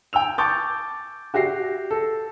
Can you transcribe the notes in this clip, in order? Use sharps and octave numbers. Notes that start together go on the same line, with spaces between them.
G5 G#5 E6 F7
A5 C#6 D6 G6 A6
F#4 G4 E5 A#6 C7
A4